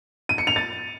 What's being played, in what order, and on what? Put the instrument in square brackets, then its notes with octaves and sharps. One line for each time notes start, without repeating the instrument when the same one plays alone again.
[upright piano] D#7
C#7
F7
A6